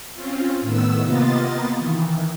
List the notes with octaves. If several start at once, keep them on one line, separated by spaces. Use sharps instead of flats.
C4 C#4 F4
A2 D#3 B3 E6
C3 A#3 B3 F4 D#5 A6
D#3 E3